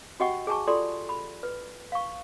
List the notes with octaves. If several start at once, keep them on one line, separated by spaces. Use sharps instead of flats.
F#4 G4 D#5 F#5 G5 C#6
G#4 G#5 A5 C#6
F4 G4 A4 D5 C6
B5
B4
F5 C#6